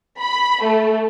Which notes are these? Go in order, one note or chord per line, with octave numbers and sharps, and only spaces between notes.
B5
A3